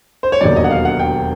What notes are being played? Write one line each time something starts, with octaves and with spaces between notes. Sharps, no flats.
C5
C#5
E1 D#2 D3 F#3 D5
D#5
F#5
F5
F#5
G5